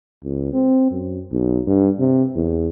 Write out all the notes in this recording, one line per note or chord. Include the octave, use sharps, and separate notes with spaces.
C#2
C4
F#2
B1
G2
C3
E2